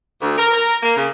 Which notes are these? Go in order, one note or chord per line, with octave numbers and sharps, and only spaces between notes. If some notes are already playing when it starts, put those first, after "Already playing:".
D2
A#4
A#4
A#3
C#3